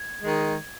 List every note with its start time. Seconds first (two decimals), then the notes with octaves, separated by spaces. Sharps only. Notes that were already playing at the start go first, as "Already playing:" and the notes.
Already playing: G#6
0.21 D#3 G#3